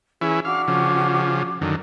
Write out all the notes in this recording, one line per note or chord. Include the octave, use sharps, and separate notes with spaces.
E3 C#4 E4 G#4
D4 F#4 F5 D6
C#3 F3
F#2 D3 D#3